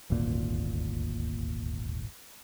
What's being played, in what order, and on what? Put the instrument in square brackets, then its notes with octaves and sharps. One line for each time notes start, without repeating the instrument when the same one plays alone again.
[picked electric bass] D#1 G#1 D2 A#2